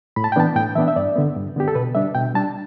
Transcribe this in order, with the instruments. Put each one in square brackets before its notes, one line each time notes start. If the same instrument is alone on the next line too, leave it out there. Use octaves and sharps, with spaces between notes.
[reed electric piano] A2 B5
A5
G5
E3 B3 D4 A5
A2 G5
E3 B3 D4 E5
E5
G2 D5
D3 B3
G2
D3 B3 G4
A4
B2 B4
G3 D4 E5
B2 G5
G3 D4 A5